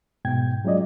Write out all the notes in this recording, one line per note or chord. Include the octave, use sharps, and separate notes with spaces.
G#2 B2 G5 G#6
F#3 G#3 C#4 F4 D5 D#5